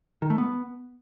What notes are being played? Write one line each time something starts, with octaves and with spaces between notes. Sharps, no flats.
D#3
A3
B3